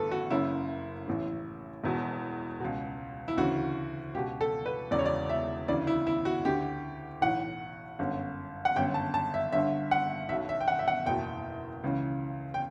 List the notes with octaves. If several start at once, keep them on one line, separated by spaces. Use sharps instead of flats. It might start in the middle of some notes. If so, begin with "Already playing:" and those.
Already playing: A1 G2 D3 A4 B4
F#4
F#1 F#2 C#3 E4
A1 A2 E3
E1 E2 B2
C#2 B2
E4
D2 C#3 E3 F#4
C#2 B2 G4
A4
B4
E1 E2 C#3 D5
C#5
D5
E5
D2 C#3 E3 D5
E4
E4
F#4
D2 D3 G4
B1 A2 E3 F#5
G1 F#2 D3
F#5
G1 F#2 D3 G5
A5
A5
E5
G1 G2 D3 E5
F#5
B1 B2 E5
E5
G5
F#5
E5
F#5
F#1 E2 B2 G5
C#2 C#3 E3
G5